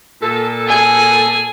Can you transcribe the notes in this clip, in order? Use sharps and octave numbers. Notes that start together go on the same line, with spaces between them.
A#2 A4
G#4 G#5